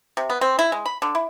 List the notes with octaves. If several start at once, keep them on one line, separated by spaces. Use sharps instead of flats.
C3
B3
C4
E4
G#3
B5
D3
E4